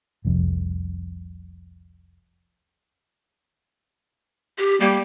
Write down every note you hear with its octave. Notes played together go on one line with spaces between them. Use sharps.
F1 C2 F2
G4
G3 A#3